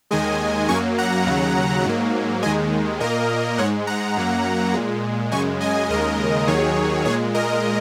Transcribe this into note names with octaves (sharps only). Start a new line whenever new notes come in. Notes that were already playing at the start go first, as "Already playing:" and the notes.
D#2 D#3 G#3 D#5 G#5
F#2 F#3 A#3 G#5 C#6
F#5 A#5
D#2 C#3 F#3
G#2 F#3 A#3
D#2 D#3 G#3 D#5 G#5
A#2 A#3 A#4 D#5
G#2 G#3 C#5 F#5
F#5 A#5
F#2 F#3 A#3
A#2 G#3
F#2 C#3 G#3 G#5 C#6
D#5 G#5
D#2 C#3 G#3 A#4 D#5
D#2 D#3 F#3 G#4 C#5
A#2 G#3 G#4 C#5
A#4 D#5